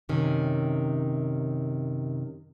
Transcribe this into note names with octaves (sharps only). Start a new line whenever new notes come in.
F#2 C3 D#3 C#4